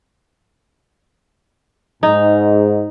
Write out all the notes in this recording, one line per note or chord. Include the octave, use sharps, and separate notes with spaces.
G#2 D#4